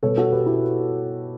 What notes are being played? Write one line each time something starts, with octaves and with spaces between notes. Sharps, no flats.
B2 G3 B3 A4 C#5
F#4 A4
G4 B4
E4 G4